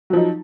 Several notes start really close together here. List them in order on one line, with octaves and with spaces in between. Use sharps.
F#3 F3 D#4